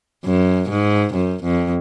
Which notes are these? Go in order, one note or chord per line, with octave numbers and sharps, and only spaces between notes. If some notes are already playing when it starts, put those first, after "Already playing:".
F#2
G#2
F#2
F2